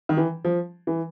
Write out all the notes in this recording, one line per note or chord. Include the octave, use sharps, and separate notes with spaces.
D#3
E3
F3
E3